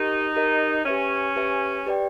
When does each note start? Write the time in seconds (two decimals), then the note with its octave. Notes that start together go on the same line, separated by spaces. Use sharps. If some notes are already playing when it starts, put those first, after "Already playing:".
Already playing: D#4 G4 A#4 D#5
0.35 G4 A#4 D#5
0.85 C#4 G4 B4 E5 G#5
1.36 G4 B4 E5 G#5
1.86 G4 B4 D5 G5